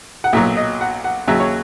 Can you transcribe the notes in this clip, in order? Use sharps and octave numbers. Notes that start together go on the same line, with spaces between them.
F#5
B1 A#2 F#3 E5
D#5
F#5
F#5
D#2 C#3 F#3 E5
C#5